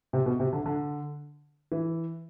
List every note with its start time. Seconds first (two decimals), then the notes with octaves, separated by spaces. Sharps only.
0.13 C3
0.26 B2
0.40 C3
0.53 D3
0.66 D3
1.72 E3